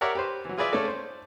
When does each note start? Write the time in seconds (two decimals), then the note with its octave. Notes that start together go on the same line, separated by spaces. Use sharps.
0.01 G4 A#4 C#5 D5 E5 F#5
0.15 G4 B4 C5
0.45 E3 F#3
0.58 F4 G#4 B4 D5 E5
0.72 A3 C#4 A4 D5
0.88 C5